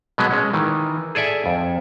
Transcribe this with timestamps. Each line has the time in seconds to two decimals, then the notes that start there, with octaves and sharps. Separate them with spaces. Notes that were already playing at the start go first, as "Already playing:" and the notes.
0.18 B2 F#3 G#3 B3
0.31 G#3 C#4
0.53 D#3 E3
1.15 G#4 A4 D5 E5 G#5
1.46 F2